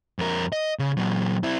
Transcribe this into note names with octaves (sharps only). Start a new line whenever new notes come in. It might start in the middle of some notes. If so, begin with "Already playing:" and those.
F2 A#4
D#5
C#3
A#2 F#3
C4 E4